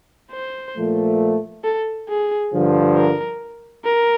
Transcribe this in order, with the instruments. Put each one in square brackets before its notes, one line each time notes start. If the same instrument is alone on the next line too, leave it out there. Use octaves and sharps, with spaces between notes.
[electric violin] C5
[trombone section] A#2 F3 A3
[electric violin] A4
G#4
[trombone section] G2 D3 F3
[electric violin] A#4
A#4